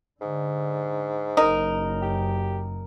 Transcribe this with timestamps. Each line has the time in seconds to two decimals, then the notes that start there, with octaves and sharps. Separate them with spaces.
0.21 G#2 D3
1.37 F#1 F#2 D#4 A#4
2.02 G4